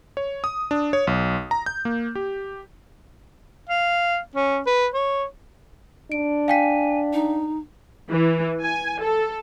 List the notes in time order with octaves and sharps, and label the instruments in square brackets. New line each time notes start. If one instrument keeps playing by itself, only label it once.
[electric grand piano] C#5
D#6
D4
C#5
B1
A#5
G6
A#3
G4
[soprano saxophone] F5
C#4
B4
C#5
[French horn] D4 [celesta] D7
[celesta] F5 G5 B6 [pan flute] G#5
[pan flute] D#4
[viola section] E3
G#5
A4